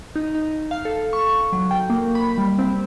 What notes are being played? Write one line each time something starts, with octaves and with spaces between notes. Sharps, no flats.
D#4
D#4
F5
A4
C#6
F#3
G5
A#3
B5
G3
C4